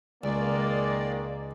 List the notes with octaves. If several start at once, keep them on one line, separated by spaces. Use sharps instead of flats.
C#2 D#3 G#3 A#3 D5